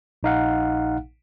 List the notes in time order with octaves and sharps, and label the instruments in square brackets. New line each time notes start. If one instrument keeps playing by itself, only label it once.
[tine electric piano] A#1 D#4 F5 F#5